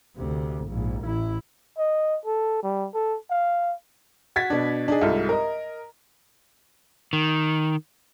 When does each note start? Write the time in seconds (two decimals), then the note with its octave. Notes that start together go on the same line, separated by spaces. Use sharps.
0.17 D2 C3
0.68 A#1 G#2
1.03 A1 E4
1.78 D#5
2.26 A4
2.63 G3
2.94 A4
3.30 F5
4.36 F#4 G#6 A6 B6
4.50 B2 D4
4.88 D4 D#4 G#4
5.01 C2 G#2 F4 A4
5.29 A#4 D#5
7.13 D#3